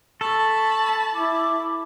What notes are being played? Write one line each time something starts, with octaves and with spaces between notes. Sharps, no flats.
A4 A5 B5 C#6
E4 D6